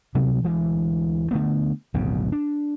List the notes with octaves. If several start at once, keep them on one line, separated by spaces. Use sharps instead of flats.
B2 F#3 G3 B3
D2 E3 G#3
D3 A3 B3
D1 B1 F2 C#3
D4